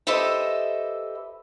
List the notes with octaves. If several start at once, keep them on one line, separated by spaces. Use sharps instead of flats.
G4 A4 B4 C5 D#5 E5